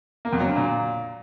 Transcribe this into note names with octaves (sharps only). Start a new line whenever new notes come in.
A#3
F2
F#3
D3
A#2